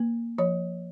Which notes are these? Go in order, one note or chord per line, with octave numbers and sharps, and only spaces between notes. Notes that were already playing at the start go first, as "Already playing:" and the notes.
Already playing: A#3
F3 C#5